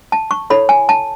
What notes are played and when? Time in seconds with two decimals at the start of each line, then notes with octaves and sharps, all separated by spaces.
0.12 A5
0.31 C#6
0.50 E4 A4 C#5 B5
0.69 G#5
0.89 A5